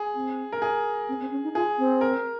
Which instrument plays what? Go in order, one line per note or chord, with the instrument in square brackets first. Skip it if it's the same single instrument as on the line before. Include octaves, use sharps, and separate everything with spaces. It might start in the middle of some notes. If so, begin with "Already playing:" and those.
Already playing: [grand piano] G#4
[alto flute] C4
[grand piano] A#4
G#4
[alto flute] C4
C4
C#4
D#4
[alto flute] F4 [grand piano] G#4
[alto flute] C4
[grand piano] A#4